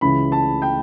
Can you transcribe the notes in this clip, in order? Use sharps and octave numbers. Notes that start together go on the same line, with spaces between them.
C#2 C#3 E3 B5
A5
G5